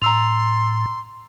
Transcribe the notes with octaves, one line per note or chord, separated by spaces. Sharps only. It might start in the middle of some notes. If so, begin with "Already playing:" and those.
A2 A#5 C6 E6 F7